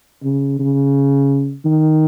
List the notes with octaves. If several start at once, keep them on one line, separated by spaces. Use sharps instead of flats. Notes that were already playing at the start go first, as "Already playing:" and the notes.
C#3
C#3
D#3